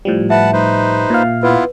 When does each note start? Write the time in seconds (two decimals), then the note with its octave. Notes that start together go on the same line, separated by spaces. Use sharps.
0.05 A2 F3 G3
0.30 B4 E5 F#5 A5
0.53 D#4 B4 C5
1.10 A#2 F5
1.43 B3 E4 F4 B4